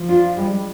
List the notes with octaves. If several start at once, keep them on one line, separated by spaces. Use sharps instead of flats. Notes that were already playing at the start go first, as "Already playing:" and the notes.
Already playing: F3
D4 F4
G3 G#3